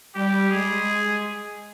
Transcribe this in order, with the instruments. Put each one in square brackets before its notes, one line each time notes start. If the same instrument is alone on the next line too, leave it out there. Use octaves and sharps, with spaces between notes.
[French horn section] G3 [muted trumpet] G4
[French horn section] G#3 [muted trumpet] G#4